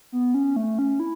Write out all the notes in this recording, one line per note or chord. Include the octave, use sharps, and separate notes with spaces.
B3
C#4
A3
C#4
E4